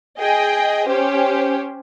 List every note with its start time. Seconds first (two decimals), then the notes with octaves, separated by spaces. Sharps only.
0.18 G#4 D#5 G5
0.87 C#4 G4 C5